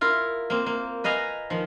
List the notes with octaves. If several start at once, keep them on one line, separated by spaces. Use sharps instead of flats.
E4 F4 A#4
A#3 C4
A#3
B4 D#5 F5 G#5 A#5
D#3 F3